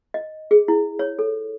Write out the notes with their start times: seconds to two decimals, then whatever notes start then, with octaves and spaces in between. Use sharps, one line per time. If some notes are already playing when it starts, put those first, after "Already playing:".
0.14 D#5
0.51 G#4
0.68 E4
0.99 C#5
1.19 A4